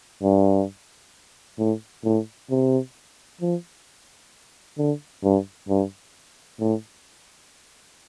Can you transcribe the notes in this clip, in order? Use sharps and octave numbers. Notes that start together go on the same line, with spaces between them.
G2
A2
A2
C3
F3
D3
G2
G2
A2